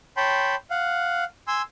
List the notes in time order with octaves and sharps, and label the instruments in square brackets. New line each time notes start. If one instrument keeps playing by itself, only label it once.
[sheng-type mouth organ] C#5 G5 A5 B5 C6
F5 F#5
G#5 C6 E6